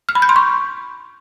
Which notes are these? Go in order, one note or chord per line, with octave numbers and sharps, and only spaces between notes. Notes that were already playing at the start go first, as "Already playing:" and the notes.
F6
B5
G6
C6
C#6